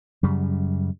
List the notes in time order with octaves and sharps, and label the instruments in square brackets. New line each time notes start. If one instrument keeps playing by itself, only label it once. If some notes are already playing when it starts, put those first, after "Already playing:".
[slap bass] F#2 C#3 G3